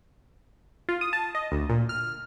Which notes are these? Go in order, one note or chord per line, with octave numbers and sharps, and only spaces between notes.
F4
D#6
A5
D#5
D2
A#2
F6